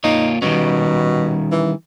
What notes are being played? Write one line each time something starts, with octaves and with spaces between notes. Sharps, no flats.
A#3 D#4 F4 C#5
B2 D#3 G3 C#4
E3